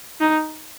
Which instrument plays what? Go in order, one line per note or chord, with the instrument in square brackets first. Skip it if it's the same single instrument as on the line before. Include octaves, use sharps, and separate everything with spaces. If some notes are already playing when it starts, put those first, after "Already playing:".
[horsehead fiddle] D#4